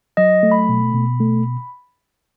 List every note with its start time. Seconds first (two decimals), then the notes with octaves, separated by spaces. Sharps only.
0.17 F#3 D#5
0.43 A3
0.51 B5
0.69 B2
0.94 B2
1.20 A3